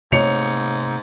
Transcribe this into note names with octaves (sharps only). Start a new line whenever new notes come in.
G#2 C3 A3 A#3 C#5 C#7 F7